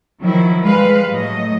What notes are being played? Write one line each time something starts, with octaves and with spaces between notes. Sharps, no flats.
D#3 F3 F#3 E4
G3 G#3 B4 F5
A2 F#3 A3 D#5